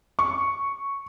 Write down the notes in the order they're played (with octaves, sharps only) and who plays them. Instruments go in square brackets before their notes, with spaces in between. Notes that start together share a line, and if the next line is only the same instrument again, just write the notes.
[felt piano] C#6